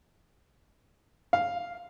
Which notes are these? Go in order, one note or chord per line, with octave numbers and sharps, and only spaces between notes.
F5